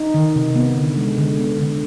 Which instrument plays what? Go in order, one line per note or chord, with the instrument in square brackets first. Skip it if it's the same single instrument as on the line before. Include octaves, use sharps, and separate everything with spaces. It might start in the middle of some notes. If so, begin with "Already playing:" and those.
Already playing: [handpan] D#4
D#3
C3
B3
D3
G#3
D3
B3
D3